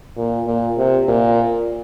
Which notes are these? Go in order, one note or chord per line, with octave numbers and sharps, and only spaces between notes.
A#2
A#2
C3
A#2